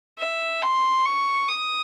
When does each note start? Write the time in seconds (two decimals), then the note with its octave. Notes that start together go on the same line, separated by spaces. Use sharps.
0.18 E5
0.62 C6
1.05 C#6
1.49 D#6